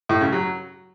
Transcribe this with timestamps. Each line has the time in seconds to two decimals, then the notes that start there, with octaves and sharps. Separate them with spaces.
0.09 A2
0.21 C#3
0.32 F#3